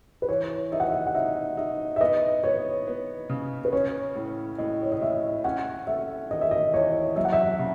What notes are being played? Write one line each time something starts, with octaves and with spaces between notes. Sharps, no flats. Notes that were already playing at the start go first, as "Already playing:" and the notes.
B4
E3 C#5
D#4 E5
F#5
E5
F#5
D#4 E5
D#4 E5
E5
B3 D#5
B3 C#5
B3
C#3
B4
C#4 C#5
A2
A2 D#5
C#5
D#5
A2 E5
C#4 F#5
A3 E5
D#3 D#5
E5
D#5
E2 C#5
F#2 E5
F#5
E5
C#3